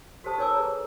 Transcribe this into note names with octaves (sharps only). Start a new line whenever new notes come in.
F#4 G4 A4 C5 A5 D#6
D#4 A#4 C#5 G#5 D6 E6
G#4 A4 B4 C#5 A#5